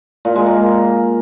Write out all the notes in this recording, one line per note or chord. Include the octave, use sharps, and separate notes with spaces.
A#2
G#3
A#3